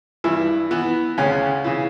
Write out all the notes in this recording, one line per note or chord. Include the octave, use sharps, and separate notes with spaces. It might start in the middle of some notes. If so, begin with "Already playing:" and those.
G2 E3 E4
E3 B3
D2 C#3 C#4
C#3 E3